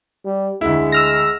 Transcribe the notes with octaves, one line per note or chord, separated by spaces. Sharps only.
G3
D2 G#3 E4
E6 F6 A#6